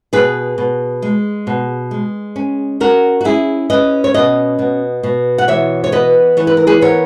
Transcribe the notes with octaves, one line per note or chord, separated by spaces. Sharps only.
B2 G#4 B4
B2
G#3
B2
G#3
C#4
C#4 F#4 A#4
F#4
C#4 E4 G#4
C#4 B4 D#5
C#5
B2 B4 D#5
B2
B2
F#5
E3 C#5 E5
C#5
B3 B4 D#5
E3 C#5
B4
A#4
G#4 B4
B3 A#4 C#5